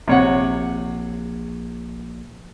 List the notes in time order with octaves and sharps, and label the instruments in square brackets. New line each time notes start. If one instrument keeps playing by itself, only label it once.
[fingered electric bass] A#1 [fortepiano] C3 C#5 F#5